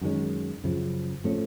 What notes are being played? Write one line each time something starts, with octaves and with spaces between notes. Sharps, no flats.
F#2 D#3 G#3 C#4
F#2 C#3 F3
A2 F3 A3 C#4